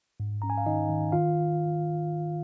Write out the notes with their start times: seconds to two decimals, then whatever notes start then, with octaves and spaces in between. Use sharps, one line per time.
0.20 G#2
0.42 C#4 A#5
0.50 G#5
0.58 F5
0.66 D#3 D#4 D#5
0.90 D#3
1.12 D#3 F4 F5